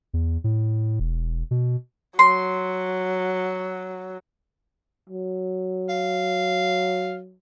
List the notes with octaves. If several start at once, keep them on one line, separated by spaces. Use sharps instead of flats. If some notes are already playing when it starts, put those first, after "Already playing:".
E2
A2
E1
B2
F#3 C6
F#3
F5